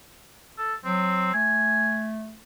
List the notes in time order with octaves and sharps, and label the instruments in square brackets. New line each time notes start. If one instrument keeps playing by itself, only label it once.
[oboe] A4
[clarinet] F#3 [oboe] C4
[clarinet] A3 [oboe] G#5